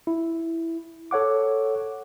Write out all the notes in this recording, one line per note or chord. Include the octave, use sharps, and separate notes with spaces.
E4
A4 C#5 F#5 D6